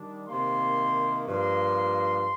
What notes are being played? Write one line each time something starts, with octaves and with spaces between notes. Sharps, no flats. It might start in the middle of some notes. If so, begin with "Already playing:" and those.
Already playing: D#3 G3 D4
C3 D#3 A#3 C6
G2 F3 A#3 C6